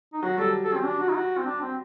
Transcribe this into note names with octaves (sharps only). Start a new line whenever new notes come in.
D#4
F#3 F#4
G3 A4
A4
C4
D4
F#4
D#4
F#4
C4
D4
C4